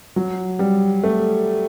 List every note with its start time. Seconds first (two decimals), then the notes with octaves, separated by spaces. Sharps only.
0.16 F#3
0.59 G3
1.04 A3